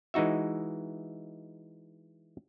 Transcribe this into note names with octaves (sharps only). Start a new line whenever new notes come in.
E3 G#3 D#4 F#4 E5